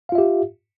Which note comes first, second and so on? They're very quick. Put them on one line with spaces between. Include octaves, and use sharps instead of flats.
F5 F4 E5 G4